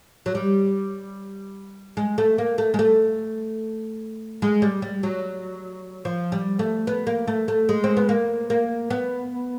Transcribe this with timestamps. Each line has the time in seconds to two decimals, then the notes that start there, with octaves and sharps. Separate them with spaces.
0.26 F#3
0.35 G3
1.97 G#3
2.18 A3
2.38 A#3
2.58 A3
2.74 G#3
2.79 A3
4.42 G#3
4.62 G3
4.82 G3
5.03 F#3
6.05 F3
6.32 G3
6.59 A3
6.87 B3
7.07 A#3
7.28 A3
7.48 A3
7.69 G#3
7.84 C4
7.97 B3
8.09 A#3
8.50 A#3
8.90 B3